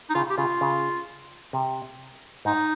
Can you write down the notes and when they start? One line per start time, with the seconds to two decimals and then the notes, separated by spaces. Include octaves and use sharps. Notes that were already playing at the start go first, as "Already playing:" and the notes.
0.10 D#4
0.15 C#3 F4
0.30 G4
0.37 C#3 F4
0.61 C#3
1.53 C3
2.45 G#2 D#4